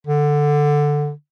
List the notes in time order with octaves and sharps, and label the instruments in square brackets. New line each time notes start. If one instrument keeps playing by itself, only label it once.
[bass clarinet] D3